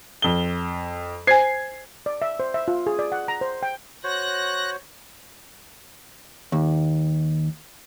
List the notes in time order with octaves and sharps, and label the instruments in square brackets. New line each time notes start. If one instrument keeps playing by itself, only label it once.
[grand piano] F2 G7
[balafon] C5 G#5 [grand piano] G#6 C7
[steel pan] D5
E5
C5
E5
F4
G#4
D5
F#5
A#5
C5
G5
[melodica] F#4 C5 C#5 [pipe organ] F#6 A#6
[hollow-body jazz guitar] D#2